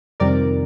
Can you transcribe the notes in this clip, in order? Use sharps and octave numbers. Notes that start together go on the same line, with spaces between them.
F2 C3 D#3 G3 A#4 D5